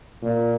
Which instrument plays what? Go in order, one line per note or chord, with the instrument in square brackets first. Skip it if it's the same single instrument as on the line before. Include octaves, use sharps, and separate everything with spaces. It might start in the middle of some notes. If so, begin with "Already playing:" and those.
[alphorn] A#2